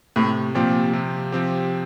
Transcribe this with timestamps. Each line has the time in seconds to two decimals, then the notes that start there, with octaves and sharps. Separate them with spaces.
0.16 A2 C3
0.55 A#2 F3 C4 G4
0.93 C3
1.32 F3 C4 G4